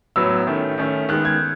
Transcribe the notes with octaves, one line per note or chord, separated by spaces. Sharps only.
A2 F#3 B3 E6
D#3 A3 C#4
D#3 A3 C#4
D#3 G#3 B3 F#6
G#6